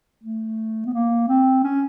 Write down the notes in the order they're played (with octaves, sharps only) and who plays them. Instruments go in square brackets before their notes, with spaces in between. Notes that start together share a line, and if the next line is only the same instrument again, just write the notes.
[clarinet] A3
B3
A#3
C4
C#4